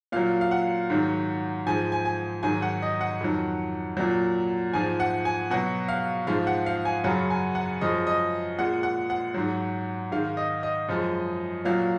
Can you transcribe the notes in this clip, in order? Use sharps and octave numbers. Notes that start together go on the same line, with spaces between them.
A#2 F#3 F5
F5
F#5
G#2 D#3 F#3
G#2 F3 G#3 G#5
G#5
G#5
G#2 D#3 F#3 G#5
F#5
D#5
F#5
F2 D#3 F#3
A#2 F#3
G#2 F3 G#3 G#5
F#5
G#5
B2 F#3 F#5
F5
G#2 F3 G#3 F5
F#5
F5
G#5
F#2 C#3 F#3 F#5
G#5
F#5
F#2 F3 G#3 D#5
D#5
A#2 G#3 F#5
F#5
F#5
G#2 F#3
G#2 D#3 G#3 F5
D#5
D#5
F#2 F3 G#3
A#2 F#3 F5